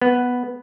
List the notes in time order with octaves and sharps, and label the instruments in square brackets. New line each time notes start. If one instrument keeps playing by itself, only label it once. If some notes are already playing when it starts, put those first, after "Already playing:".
[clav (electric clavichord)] B3